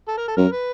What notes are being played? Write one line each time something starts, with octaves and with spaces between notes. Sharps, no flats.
A4
A#4
A4
F#2 A#4
B4